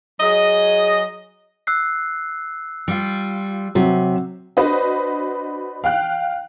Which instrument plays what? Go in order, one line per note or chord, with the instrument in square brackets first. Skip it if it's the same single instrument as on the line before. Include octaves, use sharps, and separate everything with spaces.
[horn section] F#3 G#4 D#5
[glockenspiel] E6 F#6 C7
[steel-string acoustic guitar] G3 F4
[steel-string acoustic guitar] C3 [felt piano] F#3
[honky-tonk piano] D4 F#4 B4 C5 D#5
F5 G5 F#6